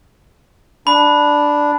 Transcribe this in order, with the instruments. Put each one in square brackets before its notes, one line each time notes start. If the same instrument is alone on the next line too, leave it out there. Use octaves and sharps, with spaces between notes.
[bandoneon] D4 [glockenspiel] B5